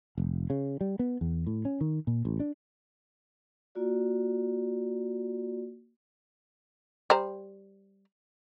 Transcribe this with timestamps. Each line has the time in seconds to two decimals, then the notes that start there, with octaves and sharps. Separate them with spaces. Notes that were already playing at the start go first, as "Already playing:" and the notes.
0.18 F1
0.50 C#3
0.81 G3
0.99 B3
1.21 E2
1.47 A2
1.65 C#4
1.81 D#3
2.07 A#2
2.25 A1
2.40 D4
3.75 A#3 F4 F#4 D5
7.10 G3 C5 A#5